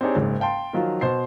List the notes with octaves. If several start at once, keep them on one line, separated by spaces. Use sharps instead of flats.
C4 D4 D#4 G4 G#4 C#5
F#1 G#2
F5 G5 A5 C6
D#3 F3 F#3 F4
B2 C5 C6 C7